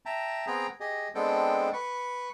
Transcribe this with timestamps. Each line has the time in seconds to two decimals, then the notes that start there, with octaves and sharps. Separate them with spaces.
0.06 E5 G5 A5 A#5
0.47 B3 C4 G#4 G5 A#5
0.80 G4 G#4 D#5
1.15 G#3 B3 C4 D4 A4 G5
1.73 B4 C#6